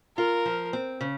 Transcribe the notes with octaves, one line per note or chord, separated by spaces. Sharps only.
F4 A#4
F3
C4
C#3